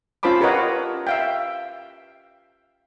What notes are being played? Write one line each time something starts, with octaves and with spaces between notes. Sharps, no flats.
C#4 F4 C5 A5 B5 D6
G4 A#4 B4 C#5 D#5 F#5
E5 F5 G5